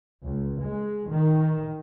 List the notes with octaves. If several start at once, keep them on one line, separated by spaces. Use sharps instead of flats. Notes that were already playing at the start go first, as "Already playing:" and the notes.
C#2
G#3
D#3